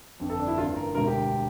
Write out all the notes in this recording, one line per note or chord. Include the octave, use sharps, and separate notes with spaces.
G1 F2 D3
A4
D4
E4
A1 G2 D3 F4
A#4
E1 D2 D3 A#4
G4